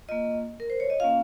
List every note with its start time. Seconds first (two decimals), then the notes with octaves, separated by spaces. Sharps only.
0.09 A#3 F4 D#5
0.60 A#4
0.70 C5
0.80 C#5
0.90 D#5
1.00 A#3 C#4 F4 F5